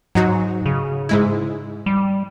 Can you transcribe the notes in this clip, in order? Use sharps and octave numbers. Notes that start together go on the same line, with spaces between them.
G#2 F#3 D#4 F#4
C#3
G#2 G#3 E4
G3